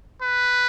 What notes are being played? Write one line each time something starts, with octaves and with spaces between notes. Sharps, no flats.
B4